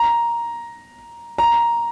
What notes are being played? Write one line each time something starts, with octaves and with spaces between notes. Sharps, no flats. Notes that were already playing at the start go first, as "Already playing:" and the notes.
Already playing: A#5
A#5